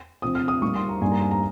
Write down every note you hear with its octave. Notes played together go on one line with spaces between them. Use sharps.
C3 F3 C4 D#6
F6
D#6
A#2 G3 A#3 D#4 C#6
C6
A#5
G2 G3 A#3 D#4 G#5
A#5
G#5
A#5